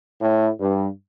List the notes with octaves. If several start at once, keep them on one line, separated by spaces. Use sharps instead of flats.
A2
G2